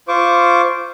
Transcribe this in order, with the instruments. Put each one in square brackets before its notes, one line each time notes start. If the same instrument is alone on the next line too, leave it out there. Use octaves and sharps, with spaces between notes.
[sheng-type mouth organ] F4 C5 C#6 D6